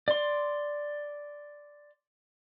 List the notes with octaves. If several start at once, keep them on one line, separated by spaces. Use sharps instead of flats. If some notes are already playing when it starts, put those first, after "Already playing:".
D5 C6